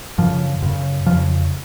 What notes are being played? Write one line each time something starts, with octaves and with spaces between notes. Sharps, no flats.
F#2 C#3 F3
F#2 C#3
F2 C#3 F3